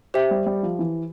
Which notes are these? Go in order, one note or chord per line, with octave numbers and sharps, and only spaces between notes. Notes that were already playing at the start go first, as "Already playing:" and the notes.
G4 C5 E5 G5
G3
G3
F3
E3